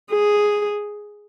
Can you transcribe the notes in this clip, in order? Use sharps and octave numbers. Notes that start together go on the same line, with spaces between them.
G#4